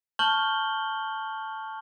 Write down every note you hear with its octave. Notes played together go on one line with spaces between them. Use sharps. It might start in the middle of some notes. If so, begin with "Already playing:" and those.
A5 C#6 F6 G6 F#7 G7